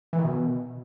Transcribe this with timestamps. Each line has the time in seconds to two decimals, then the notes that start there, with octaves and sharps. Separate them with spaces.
0.13 E3
0.19 D#3
0.24 B2